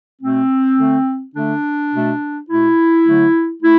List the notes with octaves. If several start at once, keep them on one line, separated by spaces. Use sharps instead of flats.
B2 A3 C4
D3 A3
D3 A3 D4
B2 A3
B2 A3 E4
D3 F#3 A3
A3 E4